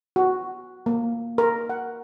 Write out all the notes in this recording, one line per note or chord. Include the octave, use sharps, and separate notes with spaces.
F#4
A#3
A#4
F#5